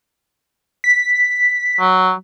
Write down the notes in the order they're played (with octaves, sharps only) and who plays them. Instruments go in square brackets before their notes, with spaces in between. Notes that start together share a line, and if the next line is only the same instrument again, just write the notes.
[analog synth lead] B6
[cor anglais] F#3